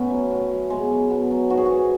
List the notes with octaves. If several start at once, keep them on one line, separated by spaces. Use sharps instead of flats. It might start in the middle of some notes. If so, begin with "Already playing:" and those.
Already playing: A2 B3 C#4
F#3
A2
F#3
B2 G#3
F#3
B2 B3
F#3
G#2 F#4
G#4
F#4
E3